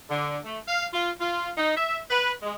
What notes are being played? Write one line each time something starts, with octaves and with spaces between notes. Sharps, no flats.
D3
A3
F5
F4
F4
D#4
E5
B4
G#3